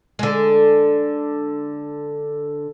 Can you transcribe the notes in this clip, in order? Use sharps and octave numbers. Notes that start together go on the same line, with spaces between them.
D3 G#3